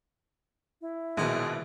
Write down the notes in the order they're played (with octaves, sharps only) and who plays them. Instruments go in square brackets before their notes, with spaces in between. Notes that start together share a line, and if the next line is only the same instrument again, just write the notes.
[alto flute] E4
[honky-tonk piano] A#1 B2 [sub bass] D#3 [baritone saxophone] G#3